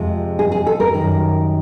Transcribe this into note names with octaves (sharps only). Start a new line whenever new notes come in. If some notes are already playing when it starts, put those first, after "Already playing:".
Already playing: F2 C3 F3 G#3
G#4
G#4
A4
A#4
F#2 D#3 G3